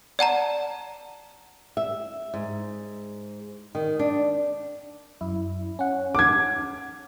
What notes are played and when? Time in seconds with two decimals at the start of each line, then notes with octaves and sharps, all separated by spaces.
0.19 D5 F#5 A5 A#5
1.77 E5
2.34 G#2
3.75 D#3
3.99 D4
5.21 F#2 E4
5.79 C#4 F#5
6.15 D6 G#6